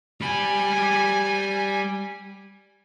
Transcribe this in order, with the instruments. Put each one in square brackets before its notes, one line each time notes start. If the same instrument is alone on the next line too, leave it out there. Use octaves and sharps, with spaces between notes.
[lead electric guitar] G3 B5 [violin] G#5